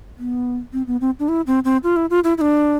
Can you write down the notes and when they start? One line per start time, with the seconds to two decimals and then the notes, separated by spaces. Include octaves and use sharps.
0.18 B3
0.73 C4
0.87 B3
1.01 C4
1.19 D4
1.29 E4
1.47 C4
1.65 C4
1.84 F4
1.96 E4
2.10 F4
2.24 E4
2.38 E4
2.41 D4